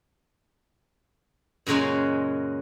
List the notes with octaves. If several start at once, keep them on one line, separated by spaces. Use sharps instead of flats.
F#2 A#2 C#3 F#3 G#3